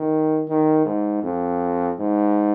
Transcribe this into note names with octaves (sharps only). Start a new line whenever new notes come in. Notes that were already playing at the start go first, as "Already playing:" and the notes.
Already playing: D#3
D#3
G#2
F2
G#2